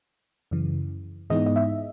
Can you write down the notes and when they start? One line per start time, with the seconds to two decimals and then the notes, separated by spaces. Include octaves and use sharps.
0.51 F#2 C#3 E3
1.30 G#2 E3 G#3 B3 D#4 D#5
1.46 D#5
1.56 E5